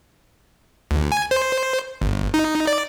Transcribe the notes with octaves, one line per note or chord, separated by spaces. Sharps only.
D2
G#5
C5
G1
D#4
D5